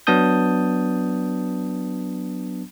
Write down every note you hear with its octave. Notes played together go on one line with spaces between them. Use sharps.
F#3 B3 D4 A5 D#6 G6